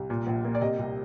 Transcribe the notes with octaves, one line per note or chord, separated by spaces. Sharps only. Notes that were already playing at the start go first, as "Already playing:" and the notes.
Already playing: C2
A#2
A#1
A#3
D5
C3 D#5
C2